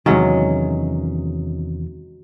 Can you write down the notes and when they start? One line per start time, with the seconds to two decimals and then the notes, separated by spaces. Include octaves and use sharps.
0.06 E2 C3 D#3 F#3 G#3 C#4